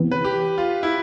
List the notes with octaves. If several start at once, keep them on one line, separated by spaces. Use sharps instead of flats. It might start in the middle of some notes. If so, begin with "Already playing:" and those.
Already playing: E2 C3 E3 B3
B4
G4
F4
E4